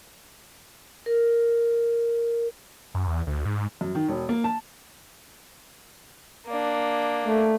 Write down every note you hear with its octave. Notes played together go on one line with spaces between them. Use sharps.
A#4
F#2
E2
D2
G#2
F#2
D#3
E1
A#3
A5
A#3 D4
A3